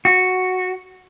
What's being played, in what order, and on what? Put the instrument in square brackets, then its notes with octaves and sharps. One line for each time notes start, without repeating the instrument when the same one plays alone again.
[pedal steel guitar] F#4